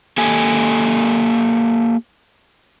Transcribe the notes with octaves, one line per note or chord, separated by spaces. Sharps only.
A#3 G4 A4 G#5